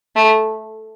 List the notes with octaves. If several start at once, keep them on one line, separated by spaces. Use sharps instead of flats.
A3